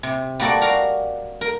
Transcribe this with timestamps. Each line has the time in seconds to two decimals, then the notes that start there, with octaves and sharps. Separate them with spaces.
0.03 C3
0.40 G3 A#3 F#4 A4 D5
0.62 F#4 A#4 F5 A#5
1.41 A#4